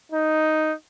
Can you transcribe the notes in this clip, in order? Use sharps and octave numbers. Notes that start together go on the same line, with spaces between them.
D#4